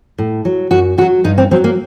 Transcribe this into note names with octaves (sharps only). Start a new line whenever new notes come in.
A2
F#3
F#2 F#4
D3 F#4
F#3
G2 D#4
C4
F#3 C4
A#3